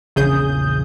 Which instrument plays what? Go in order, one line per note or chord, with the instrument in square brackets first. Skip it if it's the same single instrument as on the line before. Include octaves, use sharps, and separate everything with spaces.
[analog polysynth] A#1 E2 C#3 G#4 D#6 G6